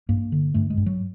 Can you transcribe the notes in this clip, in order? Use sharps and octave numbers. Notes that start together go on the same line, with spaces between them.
G2 A#3
D3
G2 A3
G#3
G2
F#3